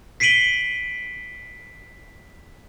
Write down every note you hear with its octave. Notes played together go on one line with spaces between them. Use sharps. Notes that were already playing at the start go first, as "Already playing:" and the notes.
B6 C7 D7 D#7 F#7 G7